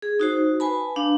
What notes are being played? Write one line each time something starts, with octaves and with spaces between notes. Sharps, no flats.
G#4
D#4 F#4 C5
B4 G#5 A5 B5
D4 F5